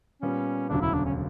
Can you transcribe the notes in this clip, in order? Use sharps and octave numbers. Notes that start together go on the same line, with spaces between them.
A#2 G3 B3 C#4
E1 D2 C#3 F#3 D4
E4
D4
C#4